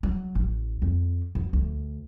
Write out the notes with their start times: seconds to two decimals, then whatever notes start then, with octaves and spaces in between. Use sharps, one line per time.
0.03 F#3
0.35 A1
0.82 F2
1.35 F#2
1.53 D2